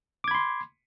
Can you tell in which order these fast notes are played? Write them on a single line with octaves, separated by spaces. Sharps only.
D6 G#6 B5 C6